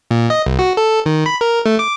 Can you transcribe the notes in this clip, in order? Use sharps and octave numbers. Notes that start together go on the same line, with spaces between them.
A#2
D#5
C2
F#4
A4
D#3
B5
A#4
A3
D6